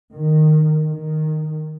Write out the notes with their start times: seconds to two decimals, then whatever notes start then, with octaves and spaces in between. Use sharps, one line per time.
0.15 D#3
0.90 D#3